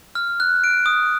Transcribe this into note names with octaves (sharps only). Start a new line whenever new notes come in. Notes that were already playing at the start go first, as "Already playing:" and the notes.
F6
F#6
D7
D#6